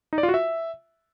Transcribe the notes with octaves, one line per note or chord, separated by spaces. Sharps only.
D#4
D5
F4
F#4
E5